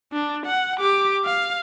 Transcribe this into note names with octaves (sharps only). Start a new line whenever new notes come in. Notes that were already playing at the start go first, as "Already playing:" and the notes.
D4
F#5
G4 D6
F5